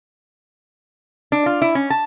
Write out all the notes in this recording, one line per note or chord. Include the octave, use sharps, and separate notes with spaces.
D4
F4
E4
C#4
A5